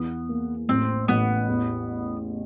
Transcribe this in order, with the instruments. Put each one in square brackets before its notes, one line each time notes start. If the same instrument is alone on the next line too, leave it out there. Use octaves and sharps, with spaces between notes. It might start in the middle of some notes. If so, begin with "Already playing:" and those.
Already playing: [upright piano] E2 E3 [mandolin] B3
[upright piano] A#3
[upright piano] A1 [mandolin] C4
[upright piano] A1 [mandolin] B3
[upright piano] E2